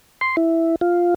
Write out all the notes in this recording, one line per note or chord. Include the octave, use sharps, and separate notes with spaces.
C6
E4
F4